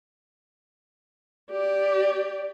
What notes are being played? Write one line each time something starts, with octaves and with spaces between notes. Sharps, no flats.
G4 D5